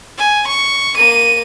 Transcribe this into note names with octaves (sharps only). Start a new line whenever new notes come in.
G#5
C#6
A#3 D#7